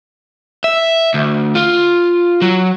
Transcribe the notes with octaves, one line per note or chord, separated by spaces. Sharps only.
E5
D2
F4
F#3